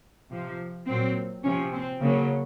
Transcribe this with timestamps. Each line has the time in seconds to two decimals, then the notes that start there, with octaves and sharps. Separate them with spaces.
0.30 C3 F3
0.87 A#2 F#3 C4
1.44 C3 F3 C#4
1.72 C4
2.01 C#3 F#3 A#3